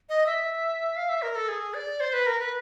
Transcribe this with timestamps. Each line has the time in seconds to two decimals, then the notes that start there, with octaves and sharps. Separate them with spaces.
0.09 D#5
0.26 E5
0.96 F5
1.09 E5
1.22 A#4
1.36 A4
1.48 G#4
1.74 D5
2.00 C5
2.13 B4
2.27 A#4
2.39 B4